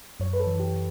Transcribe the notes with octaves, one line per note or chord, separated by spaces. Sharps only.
F#2 C#5
B4
A4
E3
G4